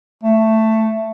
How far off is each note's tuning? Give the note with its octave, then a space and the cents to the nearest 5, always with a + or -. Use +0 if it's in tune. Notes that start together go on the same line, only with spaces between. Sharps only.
A3 +10